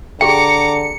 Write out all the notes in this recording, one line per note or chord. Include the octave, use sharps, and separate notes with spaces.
D3 G4 G#4 G5 A#5 D6 C#7